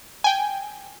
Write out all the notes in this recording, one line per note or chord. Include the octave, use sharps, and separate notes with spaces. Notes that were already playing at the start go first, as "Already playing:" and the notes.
G5 G#5